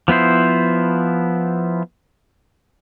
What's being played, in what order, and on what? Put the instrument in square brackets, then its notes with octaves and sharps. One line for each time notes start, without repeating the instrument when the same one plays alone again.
[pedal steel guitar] F3 B3 E4 C5